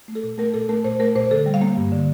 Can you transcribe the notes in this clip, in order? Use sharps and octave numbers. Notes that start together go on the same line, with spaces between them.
A3
A4
A#2
A3 A#4
A#2 A4
A3 A#4
A#2 C5
A3 A#4
A#2 C5
D3 A4
G3
F5
A#3
G2
D3